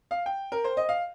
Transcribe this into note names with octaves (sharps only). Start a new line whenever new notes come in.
F5
G5
A#4
C5
D#5
F5